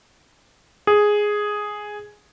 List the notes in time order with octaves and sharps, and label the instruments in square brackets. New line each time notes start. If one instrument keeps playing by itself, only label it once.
[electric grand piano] G#4